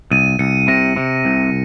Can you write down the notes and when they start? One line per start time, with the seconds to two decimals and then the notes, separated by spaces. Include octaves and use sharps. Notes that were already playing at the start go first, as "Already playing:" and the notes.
0.11 C2 D#7
0.39 C2 C#7
0.68 C3 A#6
0.96 C3
1.25 C2